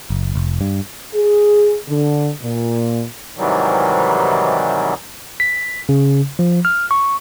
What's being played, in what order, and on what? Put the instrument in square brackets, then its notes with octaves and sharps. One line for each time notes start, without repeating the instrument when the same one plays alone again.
[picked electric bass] F#1
F1
G2
[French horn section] G#4
D3
A#2
[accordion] G#2 C3 D#3 E3 F#3 G3
[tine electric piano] B6
C#3
F3
F6
C#6